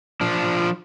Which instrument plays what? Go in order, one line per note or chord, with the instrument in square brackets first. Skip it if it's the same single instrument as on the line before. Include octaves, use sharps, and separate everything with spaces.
[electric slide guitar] F3 D4